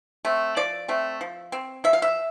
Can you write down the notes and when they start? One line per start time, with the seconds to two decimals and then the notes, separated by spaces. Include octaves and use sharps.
0.25 A3 C4
0.56 F3 D5
0.88 A3 C4
1.21 F3
1.52 C4
1.84 F3 E5
1.93 F5
2.02 E5